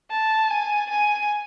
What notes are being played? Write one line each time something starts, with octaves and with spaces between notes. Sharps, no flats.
A5
G#5
G#5